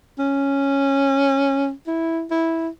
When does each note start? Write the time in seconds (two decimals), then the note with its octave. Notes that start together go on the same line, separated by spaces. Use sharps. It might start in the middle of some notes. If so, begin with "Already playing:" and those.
0.19 C#4
1.88 E4
2.31 E4